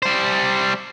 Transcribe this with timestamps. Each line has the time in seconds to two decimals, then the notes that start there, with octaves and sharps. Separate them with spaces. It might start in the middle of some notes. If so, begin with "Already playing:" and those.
0.02 G3 C5